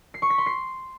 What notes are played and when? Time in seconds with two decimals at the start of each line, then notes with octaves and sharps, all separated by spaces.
0.14 C7
0.22 C#6
0.30 B6
0.38 C6
0.46 C7